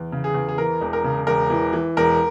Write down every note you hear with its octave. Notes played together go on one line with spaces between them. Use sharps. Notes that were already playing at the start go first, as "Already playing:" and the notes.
Already playing: E2
C#3
G#4
E2
G#4
E3 A#4
E1
A#4
C#3
E1 A#4
E3
E3
E1 A#4